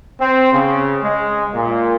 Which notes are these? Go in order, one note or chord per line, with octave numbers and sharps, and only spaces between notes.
C4
C#3
G#3
A#2